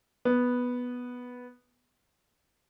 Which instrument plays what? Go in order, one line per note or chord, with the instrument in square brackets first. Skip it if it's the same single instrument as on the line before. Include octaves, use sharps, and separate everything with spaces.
[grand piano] B3